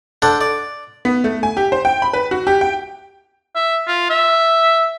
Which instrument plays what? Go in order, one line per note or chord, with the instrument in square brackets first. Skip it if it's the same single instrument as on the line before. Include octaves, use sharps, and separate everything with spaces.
[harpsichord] D4 A4 C5 F#5
D5
[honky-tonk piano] B3
A3
G#5
G4
C5
G5
B5
B4
F#4
G4
G5
[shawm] E5
F4
E5